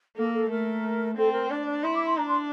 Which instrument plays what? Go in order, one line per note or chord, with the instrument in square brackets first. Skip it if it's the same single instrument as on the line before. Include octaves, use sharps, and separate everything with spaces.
[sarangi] A#3 [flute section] A4
[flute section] A4
[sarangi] A3 [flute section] A#4
[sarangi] C4 [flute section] A4
[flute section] A#4
[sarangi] D4 [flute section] D5
[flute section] D5
[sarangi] E4 [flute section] C6
[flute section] D6
C6
[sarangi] D4 [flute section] A#5
[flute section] C6